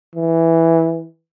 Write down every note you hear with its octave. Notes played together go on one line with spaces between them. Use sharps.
E3